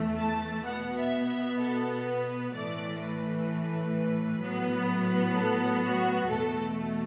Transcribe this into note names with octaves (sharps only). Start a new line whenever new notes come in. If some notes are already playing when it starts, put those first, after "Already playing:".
Already playing: E2 E3 A3
A5
B2 B3 F#5
E5
E5
A4
B4
A2 E3 A3 D5
B4
A2 F#3 B3
A4
F#4
E2 B2 A3 A4